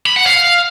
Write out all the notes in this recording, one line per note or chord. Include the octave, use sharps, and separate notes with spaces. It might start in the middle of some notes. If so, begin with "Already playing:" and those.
B5
F#5
F5